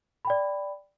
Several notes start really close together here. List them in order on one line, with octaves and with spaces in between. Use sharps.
B5 G5 D5